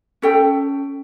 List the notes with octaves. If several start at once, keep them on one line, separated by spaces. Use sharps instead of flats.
C#4 A4 G5